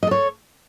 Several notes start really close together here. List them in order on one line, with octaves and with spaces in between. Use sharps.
D#5 A4 C#5